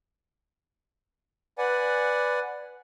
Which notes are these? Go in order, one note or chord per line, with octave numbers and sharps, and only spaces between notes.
B4 D5 F#5 G#5